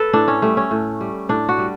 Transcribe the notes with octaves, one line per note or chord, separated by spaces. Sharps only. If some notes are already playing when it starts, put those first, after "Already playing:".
Already playing: A4 B4
A2 D4
C#4
G3 A3
C#4
A2
G3
A2 D4
F#4
G3